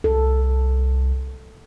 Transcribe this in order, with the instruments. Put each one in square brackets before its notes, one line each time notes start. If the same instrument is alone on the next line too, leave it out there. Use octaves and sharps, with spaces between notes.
[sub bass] C2 [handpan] A4